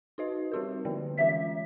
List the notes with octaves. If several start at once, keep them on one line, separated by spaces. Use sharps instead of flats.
D#4 F#4 B4 D#5
G3 C4 D#4 G4 A#4
D3 F3 A#3
E3 G#3 C#4 F4 E5